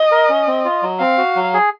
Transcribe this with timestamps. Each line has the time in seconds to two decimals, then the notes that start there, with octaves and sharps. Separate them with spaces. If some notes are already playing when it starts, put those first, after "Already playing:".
Already playing: D#5
0.11 A#4
0.29 C#4
0.47 C4
0.65 F4
0.83 F#3
1.00 C4 F5
1.18 F#4
1.36 F#3
1.53 G#4